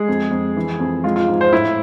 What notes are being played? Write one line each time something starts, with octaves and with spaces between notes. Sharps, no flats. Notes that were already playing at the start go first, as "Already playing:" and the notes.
Already playing: G#3 G#4
F2
F2
E3
F2
G#3 F4
F4
G#2
C5
A2 E4